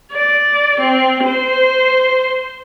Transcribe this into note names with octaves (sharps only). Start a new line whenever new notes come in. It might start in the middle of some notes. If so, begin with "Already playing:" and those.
D5
C4
C5